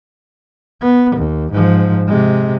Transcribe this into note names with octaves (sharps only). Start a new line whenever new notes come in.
B3
D#2
G#2 F3
C3 G#3